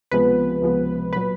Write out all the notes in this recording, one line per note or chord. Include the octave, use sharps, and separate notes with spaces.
C#2 C3 F3 G#3 B3 B4
C#2 C3 F3 G#3 B3
A#2 F#3 B4